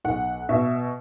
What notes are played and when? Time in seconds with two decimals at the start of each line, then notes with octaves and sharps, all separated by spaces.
0.04 B1 F#5
0.49 B2 E5